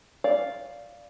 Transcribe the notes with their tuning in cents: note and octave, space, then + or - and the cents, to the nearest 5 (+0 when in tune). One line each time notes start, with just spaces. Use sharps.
D5 -10 F5 +0